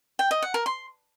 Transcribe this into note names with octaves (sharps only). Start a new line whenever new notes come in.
G5
D#5
F#5
A#4
C6